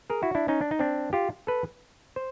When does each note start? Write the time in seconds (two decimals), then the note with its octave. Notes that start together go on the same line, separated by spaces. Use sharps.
0.10 G#4 A#4
0.23 E4 F#4
0.35 D4 E4
0.48 C#4 D#4
0.61 D4
0.71 D#4
0.79 C4 D4
1.13 F4 G4
1.47 A4 B4
2.16 C5